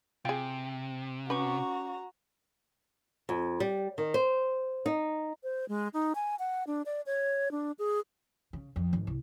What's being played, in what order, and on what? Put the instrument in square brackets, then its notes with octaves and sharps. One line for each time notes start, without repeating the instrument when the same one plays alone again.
[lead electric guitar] C3 [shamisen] F4 G#4 [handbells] G5
[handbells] C#4 C#6 [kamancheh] F#4 A#5 [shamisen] B4
[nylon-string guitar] F2
G3
D#3
C5
D#4
[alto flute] C5
G#3
D#4
G#5
F#5
D4
D5
C#5
D4
G#4
[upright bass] C#3
F2
G#1
C2